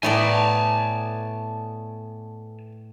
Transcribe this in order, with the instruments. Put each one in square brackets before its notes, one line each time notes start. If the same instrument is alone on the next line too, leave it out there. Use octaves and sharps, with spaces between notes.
[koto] A2 [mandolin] A3 B3 D5 [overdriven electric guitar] G#5 A5